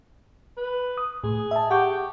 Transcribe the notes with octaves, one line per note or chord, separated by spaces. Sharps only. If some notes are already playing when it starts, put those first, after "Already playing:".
B4
D#6
A2 G#4
E5 A5
G4 F#5 C#6 G6